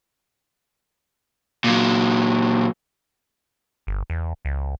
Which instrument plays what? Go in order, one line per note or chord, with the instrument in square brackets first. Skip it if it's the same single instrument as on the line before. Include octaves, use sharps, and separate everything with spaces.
[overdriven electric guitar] A#2 F#3
[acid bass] G1
E2
C#2